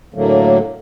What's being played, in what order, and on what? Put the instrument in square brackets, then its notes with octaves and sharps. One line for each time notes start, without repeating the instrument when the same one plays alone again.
[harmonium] A2 D3 F#3 A3 A#3